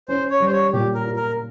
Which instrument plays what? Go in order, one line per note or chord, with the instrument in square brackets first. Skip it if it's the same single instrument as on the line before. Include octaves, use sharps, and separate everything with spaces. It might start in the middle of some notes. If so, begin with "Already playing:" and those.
[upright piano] C#4 [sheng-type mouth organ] C5
[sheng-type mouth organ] C#5
[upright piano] G3
[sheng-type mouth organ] C5
C#5
[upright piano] A#2 [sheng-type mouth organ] G4
[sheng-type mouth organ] A#4
[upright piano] F4
[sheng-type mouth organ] A#4